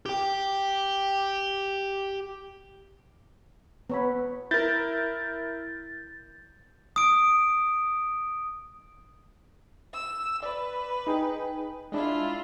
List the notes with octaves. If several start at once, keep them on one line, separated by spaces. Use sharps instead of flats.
G4 G5
B3 C#5 B5
E4 A#4 G6 A6
D#6 D7
E6
B4 D5
D#4 G#4 G5
G#3 D4 E4 F4